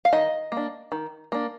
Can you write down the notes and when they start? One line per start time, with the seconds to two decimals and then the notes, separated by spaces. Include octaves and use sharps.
0.05 F5
0.12 D#3 D#5
0.52 A#3
0.57 D4
0.92 D#3
1.32 A#3 D4